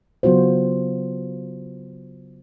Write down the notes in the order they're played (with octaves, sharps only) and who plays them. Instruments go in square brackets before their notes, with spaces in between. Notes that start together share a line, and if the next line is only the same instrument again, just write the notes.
[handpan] C#3 F#3 B3 F4 F#4 C5